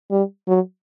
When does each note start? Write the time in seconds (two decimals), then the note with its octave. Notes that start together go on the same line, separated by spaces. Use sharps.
0.11 G3
0.48 F#3